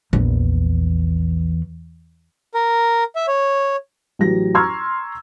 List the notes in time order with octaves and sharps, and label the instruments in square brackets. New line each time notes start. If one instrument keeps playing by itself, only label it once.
[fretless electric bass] A#1 [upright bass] E2
[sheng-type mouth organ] A#4
E5
C#5
[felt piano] A1 F#3 F#4 G4 A#6
A#5 C6 C#6 E6 F6 G#6